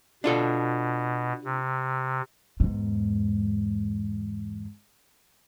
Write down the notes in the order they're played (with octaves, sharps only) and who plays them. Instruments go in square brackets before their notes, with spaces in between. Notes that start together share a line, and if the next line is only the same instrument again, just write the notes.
[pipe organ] B2 [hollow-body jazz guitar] D4 F4 A4
[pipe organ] C3
[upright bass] E2 G#2